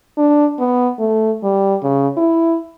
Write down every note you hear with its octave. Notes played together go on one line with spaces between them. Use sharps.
D4
B3
A3
G3
C#3
E4